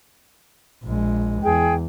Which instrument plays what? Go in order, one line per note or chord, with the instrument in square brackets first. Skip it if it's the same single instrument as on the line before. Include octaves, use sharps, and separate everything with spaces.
[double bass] A#1 G#3
[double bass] E2 [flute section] G#4 G5